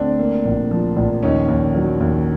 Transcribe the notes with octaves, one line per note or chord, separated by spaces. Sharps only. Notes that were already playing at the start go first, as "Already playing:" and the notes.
Already playing: D2 C4 D4
A#3
A#1
F3
A#1
D#2 C#4 D#4
D#2
F#3
D#2